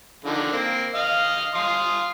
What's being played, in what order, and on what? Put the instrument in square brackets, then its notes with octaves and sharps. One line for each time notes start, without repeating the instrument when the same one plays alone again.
[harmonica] D3 D#3 F3
A#3 C4
D#5 F5 F6
F5 C6 D#6